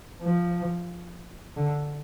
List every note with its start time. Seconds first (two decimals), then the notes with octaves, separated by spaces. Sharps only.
0.22 F3
1.56 D3